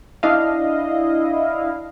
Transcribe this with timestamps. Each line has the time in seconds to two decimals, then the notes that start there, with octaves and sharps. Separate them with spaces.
0.23 D4 E4 D#5 F5